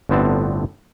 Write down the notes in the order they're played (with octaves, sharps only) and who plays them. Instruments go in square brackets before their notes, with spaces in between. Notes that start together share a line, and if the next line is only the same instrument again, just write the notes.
[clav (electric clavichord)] G1 A2 D3 B3 C4 A5